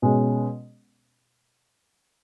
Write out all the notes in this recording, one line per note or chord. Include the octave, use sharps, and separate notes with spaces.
B2 G#3 C#4